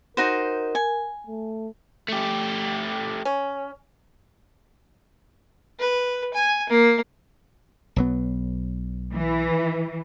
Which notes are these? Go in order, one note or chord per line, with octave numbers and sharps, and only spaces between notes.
D#4 F#4 A#4 C5
G#5
A3
A3 G4
C#4
B4
G#5
A#3
B1 F#3 B3
E3